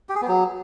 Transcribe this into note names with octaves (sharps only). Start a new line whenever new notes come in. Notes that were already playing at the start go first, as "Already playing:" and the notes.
G4
G#4
B3
F#3